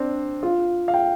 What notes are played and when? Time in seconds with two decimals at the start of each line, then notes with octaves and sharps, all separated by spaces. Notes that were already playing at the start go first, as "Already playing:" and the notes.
Already playing: C4 D4
0.43 F4
0.88 F5
0.94 G5